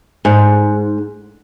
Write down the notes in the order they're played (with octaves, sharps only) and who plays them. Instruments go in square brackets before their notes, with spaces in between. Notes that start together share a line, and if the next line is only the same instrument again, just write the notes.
[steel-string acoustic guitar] G#2